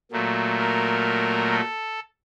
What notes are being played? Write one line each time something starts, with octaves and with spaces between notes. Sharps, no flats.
A#2 F#3 A3
A#4
A4